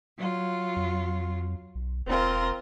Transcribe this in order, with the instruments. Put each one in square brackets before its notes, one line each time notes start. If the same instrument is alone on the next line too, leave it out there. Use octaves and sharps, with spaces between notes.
[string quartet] F#3 F4
[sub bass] F2
B1
[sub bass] E1 [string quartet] C4 F4 A#4